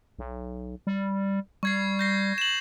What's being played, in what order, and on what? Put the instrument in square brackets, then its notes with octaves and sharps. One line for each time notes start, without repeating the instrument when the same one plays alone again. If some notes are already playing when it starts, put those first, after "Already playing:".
[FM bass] B1
G3
[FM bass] G3 [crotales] C#6 G#6 C7
[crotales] G6 A#6 C7
E7 F#7